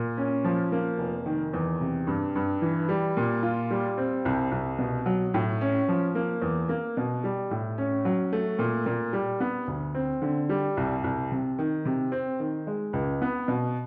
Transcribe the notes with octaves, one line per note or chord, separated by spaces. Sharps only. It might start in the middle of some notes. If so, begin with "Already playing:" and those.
Already playing: A#2
C#4
F3
A#3
F1
D#3
E2
C3
G2
G2
E3
G3
A#2
F4
G3
C4
C2
C2
B2
F#3
A2
C#4
F3
A#3
E2
A#3
B2
G3
A2
C#4
F#3
A3
A#2
A#2
G3
B3
D2
C4
D3
G3
C2
C2
C3
D#3
C3
C4
D#3
G#3
C#2
B3
B2